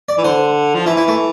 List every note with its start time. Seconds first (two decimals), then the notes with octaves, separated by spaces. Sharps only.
0.09 D5
0.18 E3
0.24 D3 C5
0.75 F3
0.86 E3 E4
0.97 E4
1.08 A3